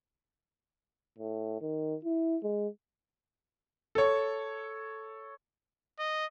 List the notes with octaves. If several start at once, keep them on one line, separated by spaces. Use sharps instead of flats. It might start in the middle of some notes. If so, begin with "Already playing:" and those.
A2
D#3
E4
G#3
A4 C#5
D#5